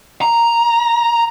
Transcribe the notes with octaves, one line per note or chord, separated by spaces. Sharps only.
A#5